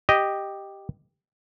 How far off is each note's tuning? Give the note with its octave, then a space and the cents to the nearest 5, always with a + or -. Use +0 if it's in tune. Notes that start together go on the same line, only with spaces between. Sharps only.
G4 +0 D#5 +0